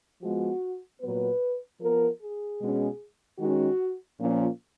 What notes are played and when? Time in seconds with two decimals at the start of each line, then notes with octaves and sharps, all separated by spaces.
0.22 F3 G#3 B3 F#4
1.01 A#2 F#3 B3 B4
1.81 F3 B3 A#4
2.21 G#4
2.61 B2 G#3 C#4
3.39 D#3 G#3 C#4 F#4
4.19 A#2 F3 A#3 C#4 F4